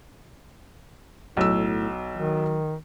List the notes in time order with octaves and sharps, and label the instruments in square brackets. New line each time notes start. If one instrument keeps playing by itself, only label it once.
[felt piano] B1 E6 [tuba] A2
[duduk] D#3 [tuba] F#3